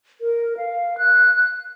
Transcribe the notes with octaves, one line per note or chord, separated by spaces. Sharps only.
A#4
F5
F#6